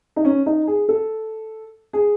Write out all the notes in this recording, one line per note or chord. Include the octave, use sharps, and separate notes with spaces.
D#4
C#4
D#4
G#4
A4
G#4